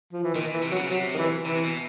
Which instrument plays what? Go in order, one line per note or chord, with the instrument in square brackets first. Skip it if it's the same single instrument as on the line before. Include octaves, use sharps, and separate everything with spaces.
[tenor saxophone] F3
E3
[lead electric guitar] A#2 [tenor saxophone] D#3
[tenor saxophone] E3
[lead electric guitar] C3
[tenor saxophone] F#3
[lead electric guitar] C#3
[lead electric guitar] C3 [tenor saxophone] F#3
[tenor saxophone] D#3
E3
[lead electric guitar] C3 [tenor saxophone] E3
[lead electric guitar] B2